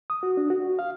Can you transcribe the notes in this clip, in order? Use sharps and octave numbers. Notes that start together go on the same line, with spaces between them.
D#6
F#4
D4
F#4
F5